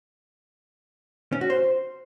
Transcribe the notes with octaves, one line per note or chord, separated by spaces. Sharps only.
C#4
F#4
C5